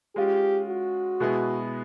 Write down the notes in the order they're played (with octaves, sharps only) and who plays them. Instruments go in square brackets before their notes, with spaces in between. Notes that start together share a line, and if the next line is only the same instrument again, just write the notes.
[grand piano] G#3 C#4 F4 [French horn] G4
[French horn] F#4
[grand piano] B2 G#3 B3 E4 G#4